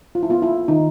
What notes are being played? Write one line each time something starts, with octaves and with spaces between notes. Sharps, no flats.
F4
E4
G#3 B3 F4
E4
D#3 D#4